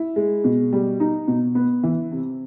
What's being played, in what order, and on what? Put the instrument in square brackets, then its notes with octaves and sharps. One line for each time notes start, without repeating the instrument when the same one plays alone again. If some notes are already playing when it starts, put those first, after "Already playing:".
Already playing: [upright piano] E4
G#3
B2
G3
D#4
B2
B3
E3
C3